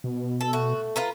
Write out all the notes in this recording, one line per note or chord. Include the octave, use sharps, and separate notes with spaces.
B2
A4
A3 F#4
F4 B4 A#5